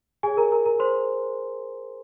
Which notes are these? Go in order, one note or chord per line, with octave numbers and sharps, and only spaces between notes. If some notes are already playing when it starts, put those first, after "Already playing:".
G4 G#4 C#5 G#5
A#4 A#5
A#4 A#5
A#4 A#5
C5 C6